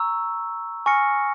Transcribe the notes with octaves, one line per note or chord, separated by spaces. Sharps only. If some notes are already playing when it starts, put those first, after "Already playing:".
Already playing: A#5 C#6 E6
G#5 C#6 F6 A#6 C#7